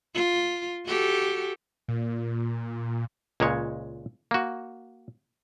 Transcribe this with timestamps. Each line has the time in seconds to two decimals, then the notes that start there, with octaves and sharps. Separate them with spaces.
0.15 F4
0.86 F#4 G4 A4
1.88 A#2
3.40 C#2 A#2 G#3 C#5
4.31 A#3 F#4